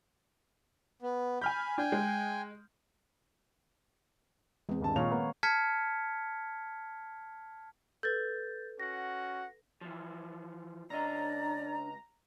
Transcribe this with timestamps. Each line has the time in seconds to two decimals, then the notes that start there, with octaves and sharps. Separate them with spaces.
1.02 B3
1.41 G#5 B5 F6 G6
1.78 D4 G5 G#5
1.92 G#3
4.69 E2 G#3 C4
4.80 D#1 G2 A5
4.96 A#2 D#3 C#5 F5 F7
5.11 A#3 B3
5.43 A5 F6 G#6 B6 C#7
8.03 A4 B4 G6 A6
8.80 C#4 F#4 F#5 A#6
9.81 E3 F3
10.90 C#2 D4 D5 D#5 A#5